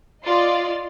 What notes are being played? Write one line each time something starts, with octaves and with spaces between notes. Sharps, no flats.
F4 D5 D#5 C6 A6